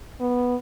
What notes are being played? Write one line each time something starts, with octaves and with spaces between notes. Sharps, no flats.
B3